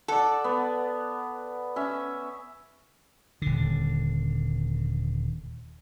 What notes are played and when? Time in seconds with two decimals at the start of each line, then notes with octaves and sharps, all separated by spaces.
0.08 A4 D5 F#5
0.44 B3
1.76 C#4 E5
3.42 D#1 D3